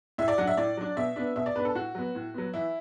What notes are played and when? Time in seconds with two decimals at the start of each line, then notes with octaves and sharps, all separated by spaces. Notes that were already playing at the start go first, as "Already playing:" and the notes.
0.18 A2 E5
0.28 D5
0.38 F#3 D4 F#5
0.47 E5
0.57 A2 D5
0.77 F#3 D4
0.96 B2 E5
1.16 B3 D4
1.36 B2 E5
1.46 D5
1.55 B3 D4 B4
1.65 A4
1.75 A2 F#4
1.95 F#3 B3
2.15 A2
2.34 F#3 B3
2.54 E3 E4